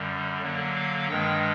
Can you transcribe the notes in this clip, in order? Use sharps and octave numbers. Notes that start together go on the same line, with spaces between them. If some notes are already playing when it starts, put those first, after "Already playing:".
Already playing: F#2 D3 G3
D3 F#3 A#3
F5
G2 D#3 G#3 G5